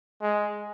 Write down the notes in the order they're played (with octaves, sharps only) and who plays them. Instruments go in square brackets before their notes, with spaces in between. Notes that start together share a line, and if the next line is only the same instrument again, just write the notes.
[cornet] G#3